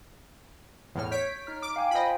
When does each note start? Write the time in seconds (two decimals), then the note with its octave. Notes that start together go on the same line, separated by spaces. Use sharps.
0.95 E2 A2 F6
1.11 C#5 G6 B6 D7
1.47 D#4 F6
1.62 D6 D7
1.76 F5 G5 G#5
1.91 F4 C5 D#5 B5